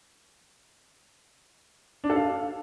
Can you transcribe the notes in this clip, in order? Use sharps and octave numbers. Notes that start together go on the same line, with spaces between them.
D4
A4
F5